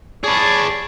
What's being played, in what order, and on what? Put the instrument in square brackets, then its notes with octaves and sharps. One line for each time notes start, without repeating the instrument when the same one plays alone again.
[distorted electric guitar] G#4 B4 [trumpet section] C#5 D5 A5